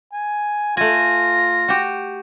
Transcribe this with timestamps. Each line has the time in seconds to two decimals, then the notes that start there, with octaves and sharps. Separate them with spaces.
0.13 G#5
0.77 A3 F4 G#5 A#6
1.68 F#4 G4